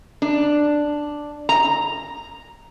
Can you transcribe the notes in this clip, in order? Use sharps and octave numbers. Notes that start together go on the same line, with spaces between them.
D4
A#5